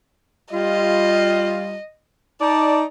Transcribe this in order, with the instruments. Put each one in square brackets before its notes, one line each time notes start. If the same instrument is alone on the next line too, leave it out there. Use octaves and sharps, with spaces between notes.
[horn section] G3 F4 [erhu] D#5
[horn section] D#4 D5 [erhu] A5